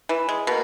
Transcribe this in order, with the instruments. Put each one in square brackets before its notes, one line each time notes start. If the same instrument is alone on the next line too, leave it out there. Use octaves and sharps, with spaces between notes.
[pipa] E3
G#3
[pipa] B2 [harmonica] A#3